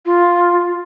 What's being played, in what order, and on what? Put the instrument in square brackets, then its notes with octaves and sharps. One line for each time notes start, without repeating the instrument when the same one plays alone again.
[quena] F4